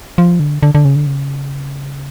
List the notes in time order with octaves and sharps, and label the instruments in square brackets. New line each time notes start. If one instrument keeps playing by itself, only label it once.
[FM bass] F3
D3
D3
D3
C#3
D3
C#3